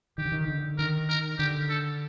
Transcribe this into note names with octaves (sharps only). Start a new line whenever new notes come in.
D#3 G4
D3
D#3
D3
D#3 A#4
A#4
D3 G4
A4